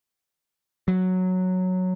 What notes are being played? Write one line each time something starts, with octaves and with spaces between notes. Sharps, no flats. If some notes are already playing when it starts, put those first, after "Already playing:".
F#3